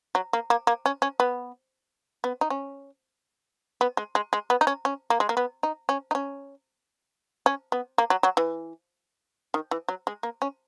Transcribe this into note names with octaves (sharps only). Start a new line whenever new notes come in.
F#3
A#3
A#3
A#3
C#4
C#4
B3
B3
D#4
C#4
B3
G#3
G#3
G#3
B3
D#4
C#4
C#4
A#3
G#3
A#3
B3
D#4
C#4
D#4
C#4
C#4
B3
A#3
F#3
F#3
E3
D#3
E3
F#3
G#3
A#3
C#4